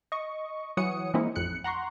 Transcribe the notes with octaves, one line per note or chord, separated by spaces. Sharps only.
D#5 C#6
E3 F#3 C#5 F#5 D#6 C#7
E3 G#3 A#3 C4 D#4 E4
A1 F2 F#6 C#7
F#5 A#5 C6 C#6